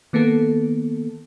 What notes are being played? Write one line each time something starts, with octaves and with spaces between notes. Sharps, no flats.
D#3 A#3 B3 A4